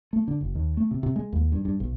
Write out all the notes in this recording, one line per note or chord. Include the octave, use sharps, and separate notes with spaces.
A3
D3
F#1
D#2
A3
C3
C3
G#3
D#2
G2
G2
B1